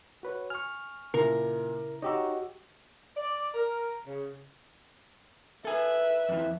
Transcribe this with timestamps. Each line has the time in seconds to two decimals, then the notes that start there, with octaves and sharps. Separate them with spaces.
0.23 F#4 B4 C#5
0.50 G#5 C#6 F6
1.14 A#2 C#3 E4 A#4
2.02 D#4 F#4 G4 C#5 D#5 E6
3.16 D5
3.53 A#4
4.07 C#3
5.65 A4 B4 E5 G#5
6.29 F2 E3